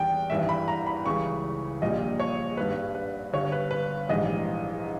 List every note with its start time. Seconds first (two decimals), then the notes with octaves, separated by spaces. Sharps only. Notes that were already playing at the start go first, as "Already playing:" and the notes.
Already playing: E2 D#3 G3 G5
0.30 G#1 G2 E3 E5
0.49 B5
0.68 A#5
0.87 B5
1.06 C#2 C#3 E3 G3 C#6
1.82 A#1 A#2 G3 D#5
2.20 C#5
2.57 G#1 G2 G3 B4
2.95 B4
3.33 G1 G2 G3 C#5
3.52 B4
3.71 B4
4.09 A#1 G#2 E3 G3 D#5